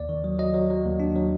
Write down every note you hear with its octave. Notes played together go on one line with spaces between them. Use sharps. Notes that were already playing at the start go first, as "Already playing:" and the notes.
Already playing: D#2 D5
D#3
F#3
F#3 D#5
F#3
F#3
D#2
D4
F#3